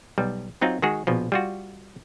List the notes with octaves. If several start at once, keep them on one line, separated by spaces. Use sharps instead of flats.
B1 G3
F#3 C4 D#4 F4
D#3 G#3 F#4 G#4
A#1 B2 F3
G3 F4 F#4